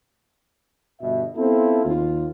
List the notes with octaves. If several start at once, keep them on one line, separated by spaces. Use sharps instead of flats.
G1 B2 E5
B3 C4 E4 F4 A4
D#2 F4